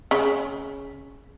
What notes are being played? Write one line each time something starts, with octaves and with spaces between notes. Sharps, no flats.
C#3